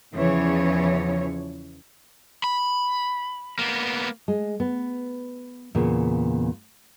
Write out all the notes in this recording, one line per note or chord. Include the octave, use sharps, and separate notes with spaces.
E2 C#3 E3 F3 C#5
B5
A#3 B3
G#3
B3
E2 A#2 C#3